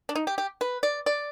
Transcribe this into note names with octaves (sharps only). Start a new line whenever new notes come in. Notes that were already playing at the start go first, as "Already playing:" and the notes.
D4
D#4
G4
G4
B4
D5
D5